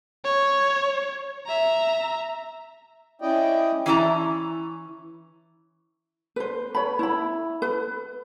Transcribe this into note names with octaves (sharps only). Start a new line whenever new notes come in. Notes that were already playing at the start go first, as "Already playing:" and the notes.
C#5
E5 A#5
C#4 E4 D5 D#5 G5
E3 C#4 E4 A4 A5 A#5
B4 C5
C#5 B5
E4 B5
B4